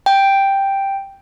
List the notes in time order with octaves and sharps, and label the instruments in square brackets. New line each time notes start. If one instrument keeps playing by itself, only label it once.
[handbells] G5